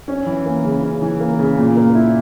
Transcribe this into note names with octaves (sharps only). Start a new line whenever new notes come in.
C#4
E3
A#3
C#3
C#4
E3
A#3
C#3
A#2
A#3
E4